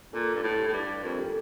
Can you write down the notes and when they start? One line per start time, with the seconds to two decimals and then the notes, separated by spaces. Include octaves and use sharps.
0.13 A#2 A4
0.34 G2
0.43 A2
0.58 G4
0.68 A2
0.73 G2
1.03 F2 A#4
1.11 A4
1.18 G4
1.25 A4